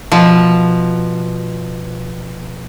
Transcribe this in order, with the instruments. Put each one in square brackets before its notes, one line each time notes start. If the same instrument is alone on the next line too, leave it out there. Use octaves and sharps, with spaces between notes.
[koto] B2 F3